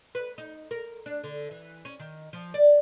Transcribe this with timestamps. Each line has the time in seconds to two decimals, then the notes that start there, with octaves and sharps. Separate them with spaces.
0.15 B4
0.38 D#4
0.71 A#4
1.06 D4
1.23 D3
1.51 E3
1.85 C#4
2.00 D#3
2.33 F3
2.54 D5